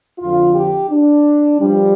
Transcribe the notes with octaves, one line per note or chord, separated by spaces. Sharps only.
F2 D3 F3 F4
G4
D4
G2 F3 G3